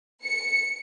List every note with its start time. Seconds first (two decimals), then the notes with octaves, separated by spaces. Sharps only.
0.23 C#7